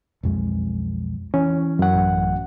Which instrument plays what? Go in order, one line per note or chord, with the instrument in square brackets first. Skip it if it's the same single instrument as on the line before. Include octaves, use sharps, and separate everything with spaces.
[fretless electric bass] B1 F2 G#3
[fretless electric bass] E3 [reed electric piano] C#4
[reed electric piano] F#2 F#5
[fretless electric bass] A1